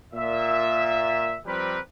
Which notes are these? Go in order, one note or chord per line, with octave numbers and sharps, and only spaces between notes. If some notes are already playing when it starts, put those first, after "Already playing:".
A#2 E5
F3 G3 C4 G4 A#4 B4